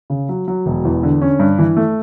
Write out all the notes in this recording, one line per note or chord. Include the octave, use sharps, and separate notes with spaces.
C#3
F#3
F#3
E1
E2
D3
C#4
G2
E3
A3